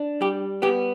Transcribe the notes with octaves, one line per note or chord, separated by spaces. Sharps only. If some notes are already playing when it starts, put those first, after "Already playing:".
Already playing: D4
G3 G4
B3 G4